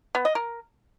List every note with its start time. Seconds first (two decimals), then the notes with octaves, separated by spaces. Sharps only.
0.15 B3
0.25 D#5
0.35 A#4